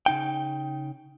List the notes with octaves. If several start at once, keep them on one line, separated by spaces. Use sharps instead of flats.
C#3 D#4 G5